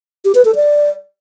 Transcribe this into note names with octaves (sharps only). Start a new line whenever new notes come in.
G4
B4
A4
D5